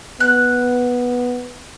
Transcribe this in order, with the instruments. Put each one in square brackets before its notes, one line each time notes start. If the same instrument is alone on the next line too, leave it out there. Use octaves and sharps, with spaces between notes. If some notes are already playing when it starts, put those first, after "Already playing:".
[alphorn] B3 [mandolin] F#6